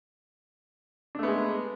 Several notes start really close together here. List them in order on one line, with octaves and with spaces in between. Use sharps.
D4 A3 B3 G#3